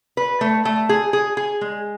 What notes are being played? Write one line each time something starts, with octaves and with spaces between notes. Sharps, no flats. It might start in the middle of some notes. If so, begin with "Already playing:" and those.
B4
A3
A3
G#4
G#4
G#4
G#3